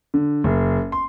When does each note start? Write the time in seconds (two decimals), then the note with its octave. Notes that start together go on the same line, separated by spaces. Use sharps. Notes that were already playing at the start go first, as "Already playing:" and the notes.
0.14 D3
0.44 F#1
0.92 C6